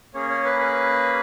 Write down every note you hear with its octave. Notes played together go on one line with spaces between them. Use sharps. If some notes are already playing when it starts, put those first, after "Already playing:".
A#3 C#4 G#4 C#5
C#5
B4
B4